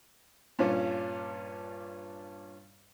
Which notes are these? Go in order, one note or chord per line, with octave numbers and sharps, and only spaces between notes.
G2 A#2 C#4 D4 F4